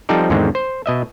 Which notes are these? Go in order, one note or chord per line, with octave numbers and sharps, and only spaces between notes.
F3 G3 C4 D#4 A4 D5
E2 G#2 D3 D#3 G#3 C4
C5
B2 D#5 E5